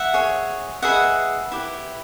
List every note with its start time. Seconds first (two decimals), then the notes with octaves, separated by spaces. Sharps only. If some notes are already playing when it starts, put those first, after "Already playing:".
Already playing: E5 F#5
0.13 G#4 C#5
0.82 G#4 B4 D#5 E5 F#5
1.51 E4 G4 B4